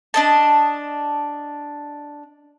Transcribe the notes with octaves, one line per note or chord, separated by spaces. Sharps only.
D4 D#5 A5